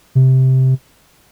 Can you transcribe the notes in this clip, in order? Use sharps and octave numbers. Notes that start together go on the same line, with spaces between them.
C3